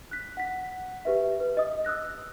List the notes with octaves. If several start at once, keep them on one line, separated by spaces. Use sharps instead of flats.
F#6 B6
F#5 B6
G4 B4 E5
B4
D#5 D#6
D#6 E6 F#6 A#6